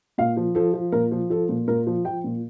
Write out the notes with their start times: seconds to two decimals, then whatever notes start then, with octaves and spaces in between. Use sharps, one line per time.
0.18 A#2 F5
0.37 F3
0.55 F3 A4
0.74 F3
0.92 A#2 A#4
1.12 F3
1.30 F3 A4
1.49 A#2
1.68 A#2 A#4
1.87 F3
2.05 F3 G5
2.24 A#2